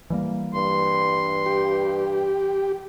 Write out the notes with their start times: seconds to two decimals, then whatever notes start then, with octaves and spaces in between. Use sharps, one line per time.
0.10 E3 G3 A#3
0.55 G2 C6
1.46 G4